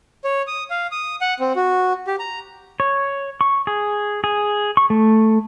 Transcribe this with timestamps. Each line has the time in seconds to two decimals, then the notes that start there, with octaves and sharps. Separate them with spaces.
0.24 C#5
0.47 D#6
0.70 F5
0.91 D#6
1.21 F#5
1.40 C4
1.56 F#4
2.07 G4
2.19 A#5
2.80 C#5
3.41 C#6
3.67 G#4
4.24 G#4
4.77 C#6
4.90 A3